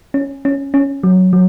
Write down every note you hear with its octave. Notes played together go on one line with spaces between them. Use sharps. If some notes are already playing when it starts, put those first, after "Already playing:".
C#4
C#4
C#4
F#3
F#3